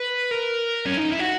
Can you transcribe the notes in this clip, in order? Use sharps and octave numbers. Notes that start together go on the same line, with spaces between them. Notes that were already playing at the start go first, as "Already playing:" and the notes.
Already playing: B4
A#4
C#4
D#4
E4
F#4